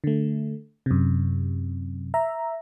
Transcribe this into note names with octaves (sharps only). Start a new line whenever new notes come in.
D3 A3
F#2 C3
E5 A#5